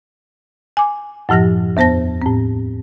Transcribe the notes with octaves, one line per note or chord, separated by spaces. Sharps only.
G#5 D6
F#2 A2 F3 G4 A#6
E2 B3 C5 A5 A#6
A2 C4